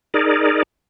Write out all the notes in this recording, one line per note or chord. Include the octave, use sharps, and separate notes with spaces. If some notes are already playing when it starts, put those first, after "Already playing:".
D#4 G#4 A#4 D5